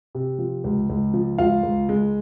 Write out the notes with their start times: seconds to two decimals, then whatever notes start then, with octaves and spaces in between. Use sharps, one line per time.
0.15 C3
0.39 F3
0.64 C#2
0.90 C#2
1.13 F3
1.38 C#2 F4 F5
1.63 C#2
1.89 G#3